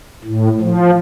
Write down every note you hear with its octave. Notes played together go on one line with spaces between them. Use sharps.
A2
F3